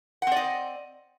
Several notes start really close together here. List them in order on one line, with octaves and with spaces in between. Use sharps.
F#5 C4 D5 D#5